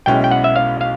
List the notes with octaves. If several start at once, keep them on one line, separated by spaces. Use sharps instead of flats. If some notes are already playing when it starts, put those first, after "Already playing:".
B1 B2 G#3 C#4 E4 G5
G5
F#5
E5
F5
F5